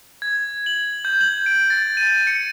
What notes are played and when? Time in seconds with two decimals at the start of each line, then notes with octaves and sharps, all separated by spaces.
0.22 G#6
0.66 F#7
1.05 G6
1.21 F#7
1.46 D7
1.70 A6
1.97 D#7
2.27 C#7